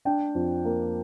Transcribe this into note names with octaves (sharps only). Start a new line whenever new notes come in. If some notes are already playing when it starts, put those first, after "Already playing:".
D4 G5
F2
A#3